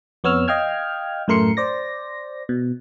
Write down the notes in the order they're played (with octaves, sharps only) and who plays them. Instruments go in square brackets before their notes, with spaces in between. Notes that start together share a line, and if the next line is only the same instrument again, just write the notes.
[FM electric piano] F2 B3 C#5 E6 F6
D#5 F5 G5 F6 G#6
F#2 A2 A3 A#4 C6 C#7
C5 D5 A#6
B2